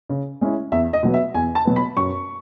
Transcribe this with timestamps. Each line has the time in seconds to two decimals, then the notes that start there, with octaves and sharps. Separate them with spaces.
0.09 C#3
0.41 G#3 C#4 E4
0.72 E2 E5
0.93 D#5
1.03 B2 F#3 B3
1.14 E5
1.34 E2 G#5
1.55 A5
1.65 B2 F#3 B3
1.76 B5
1.97 F#2 C#6